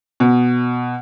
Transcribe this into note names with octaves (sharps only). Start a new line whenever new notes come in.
B2